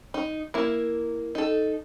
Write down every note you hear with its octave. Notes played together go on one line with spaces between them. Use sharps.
D#4
A#3 E4
D#4 A4